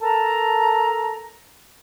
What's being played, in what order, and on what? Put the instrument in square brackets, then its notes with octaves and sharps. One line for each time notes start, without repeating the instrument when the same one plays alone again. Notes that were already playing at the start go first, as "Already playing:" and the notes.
[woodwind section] A4 A#4 A5 A#5